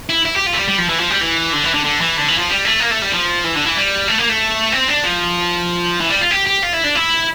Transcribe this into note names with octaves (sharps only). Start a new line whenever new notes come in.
E4
E4
G4
F4
A3
G3
G3
F3
E3
F3
G3
E3
D3
E3
D3
D3
E3
D3
E3
F3
G3
A3
A#3
A3
G3
F3
E3
D3
E3
G3
A3
A#3
A3
C4
D4
F3
E3
G3
F4
G4
G4
F4
E4
D4
E4